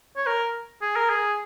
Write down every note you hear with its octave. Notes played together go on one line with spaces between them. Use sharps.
C#5
A#4
G#4
A#4
G#4